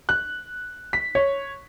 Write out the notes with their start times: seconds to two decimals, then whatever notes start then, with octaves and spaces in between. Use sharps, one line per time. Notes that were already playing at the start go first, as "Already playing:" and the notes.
0.09 F#6
0.93 B6
1.15 C#5